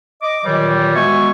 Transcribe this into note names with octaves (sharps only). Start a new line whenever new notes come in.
D#5 D6
A#2 D#3 E3 F#3 G3
G#3 B3 F#4 E5 G#5 C#6